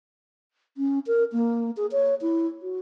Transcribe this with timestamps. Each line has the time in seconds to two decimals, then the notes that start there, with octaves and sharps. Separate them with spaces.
0.77 C#4
1.07 A#4
1.32 A#3
1.77 G#4
1.92 C#5
2.22 E4
2.62 F#4